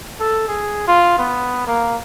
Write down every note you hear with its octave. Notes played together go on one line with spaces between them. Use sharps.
A4
G#4
F4
B3
A#3